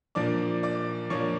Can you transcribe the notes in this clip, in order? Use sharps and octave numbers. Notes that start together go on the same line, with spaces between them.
A#2 F3 A#3 D4 D5 D6
D5 D6
A#2 F3 A#3 D4 C#5 C#6